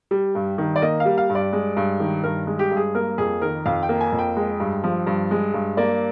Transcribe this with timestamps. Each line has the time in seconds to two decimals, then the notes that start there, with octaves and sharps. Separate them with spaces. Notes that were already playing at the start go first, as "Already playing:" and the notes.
0.11 G3
0.35 G2
0.58 D#3
0.76 D5
0.82 A#3 D#5
1.00 F5
1.05 G3
1.18 F5
1.30 G2
1.35 D5
1.53 G#3
1.77 G2
2.00 D#3
2.24 G2 A#4
2.47 G#3
2.59 G4
2.71 G2
2.77 G#4
2.95 A#3 A#4
3.18 F2 G#4
3.42 D#3 A#4
3.66 F2 F5
3.83 G5
3.89 A#3
4.01 G#5
4.13 F2
4.19 G5
4.37 G#3
4.60 G2
4.84 F3
5.07 G2
5.31 G#3
5.54 G2
5.77 A#3 D5